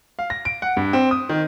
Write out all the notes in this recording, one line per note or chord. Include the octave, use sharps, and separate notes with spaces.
F5
A#6
D7
F#5
G2
C4
D#6
D#3